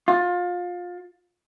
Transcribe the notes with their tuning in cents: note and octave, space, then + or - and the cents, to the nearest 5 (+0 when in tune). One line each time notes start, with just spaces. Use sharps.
F4 +25